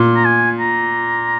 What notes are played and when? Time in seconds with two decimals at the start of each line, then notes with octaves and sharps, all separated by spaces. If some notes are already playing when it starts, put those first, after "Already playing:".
Already playing: A#2
0.16 A#5
0.25 G#5
0.60 A#5